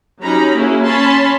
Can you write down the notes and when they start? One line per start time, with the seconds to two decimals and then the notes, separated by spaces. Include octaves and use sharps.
0.22 F#3 C#4 D#4 G4 A#5 B5
0.55 A#3 C#4 E4 F#4 G#4
0.83 C#4 C#5 A5 B5 C6